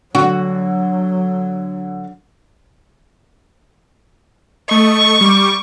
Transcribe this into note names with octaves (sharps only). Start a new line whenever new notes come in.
D3 F#3 F#4
A3 D#5 C#6
G3 D6